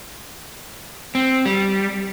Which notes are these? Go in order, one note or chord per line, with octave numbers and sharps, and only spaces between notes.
C4
G3